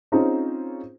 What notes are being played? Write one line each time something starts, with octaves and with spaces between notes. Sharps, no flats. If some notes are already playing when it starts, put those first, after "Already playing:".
C4 C#4 D#4 F4 G#4 C5